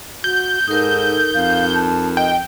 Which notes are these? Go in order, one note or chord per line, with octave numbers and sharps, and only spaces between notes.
F#4 G6
G#2 D#4 A4 A#4
F2 F5
A5
D#5 G5